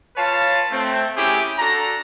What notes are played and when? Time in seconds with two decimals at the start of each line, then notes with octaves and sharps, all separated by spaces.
0.17 F4 B4 C#5 F5 A5
0.71 A3 C4
1.16 A3 C#4 E4 G4 G#4
1.58 D4 F#4 A4 A#5